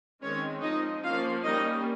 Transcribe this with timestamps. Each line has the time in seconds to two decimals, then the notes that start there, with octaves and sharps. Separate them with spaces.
0.22 D#3 G#3 C4 C#4 C#5
0.62 F3 C4 D#4 D#5
1.03 F3 A#3 C#4 F4 F5
1.44 G3 A#3 C#4 D#4 D#5